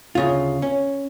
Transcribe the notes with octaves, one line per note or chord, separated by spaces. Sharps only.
D2 C#3 F4
C#4